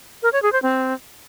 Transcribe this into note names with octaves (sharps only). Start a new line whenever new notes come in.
A#4
C#5
G#4
C5
C4